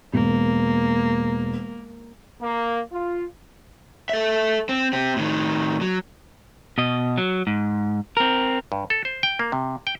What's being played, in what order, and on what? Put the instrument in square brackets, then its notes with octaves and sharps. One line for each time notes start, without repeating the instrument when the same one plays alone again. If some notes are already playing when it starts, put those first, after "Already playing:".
[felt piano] E1 [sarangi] A#3
[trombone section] A#3
F4
[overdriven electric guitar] A4 E5
C4
C4 G4
A2 D#3
F#3
[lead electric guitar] B2 D#5
F#3
G#2
C4 A#4
[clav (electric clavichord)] G2
A4
C5
G5
A#3
C3
G5